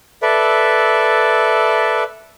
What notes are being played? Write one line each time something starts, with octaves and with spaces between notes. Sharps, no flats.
A4 B4 D5 E5